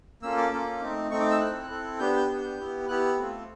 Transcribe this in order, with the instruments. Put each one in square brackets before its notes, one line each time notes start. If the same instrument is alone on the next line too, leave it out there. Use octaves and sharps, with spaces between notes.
[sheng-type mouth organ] A#3 C#4 F4 A4 E6
D6
A#3 C#4 F4 A4
A3 C4 D#4
A3 C4 D#4 C#6
D6
E6
C4 E4 A4 F#6
C4 E4 A4
B3 D4 G4 G6
G6
B3 D4 G4
B3 E4 G4
B3 E4 G4 F#6
A3 C4 F4 A4